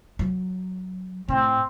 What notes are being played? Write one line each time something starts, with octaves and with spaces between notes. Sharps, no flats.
F#3
A2 C4